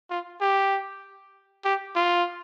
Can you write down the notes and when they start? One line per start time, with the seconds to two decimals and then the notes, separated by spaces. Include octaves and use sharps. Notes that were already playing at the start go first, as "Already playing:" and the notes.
0.11 F4
0.41 G4
1.65 G4
1.96 F4